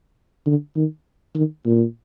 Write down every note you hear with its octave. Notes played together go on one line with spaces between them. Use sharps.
D3
D#3
D#3
A#2